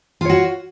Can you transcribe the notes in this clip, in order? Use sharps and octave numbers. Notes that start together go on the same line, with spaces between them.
F4 F#4 C#5